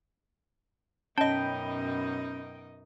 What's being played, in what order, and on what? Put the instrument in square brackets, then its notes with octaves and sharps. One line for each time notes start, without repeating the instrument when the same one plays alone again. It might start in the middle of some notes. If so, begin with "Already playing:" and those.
[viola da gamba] F#2 B2 D#4 [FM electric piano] C#4 B5 [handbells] D#5 A5 [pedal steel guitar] G5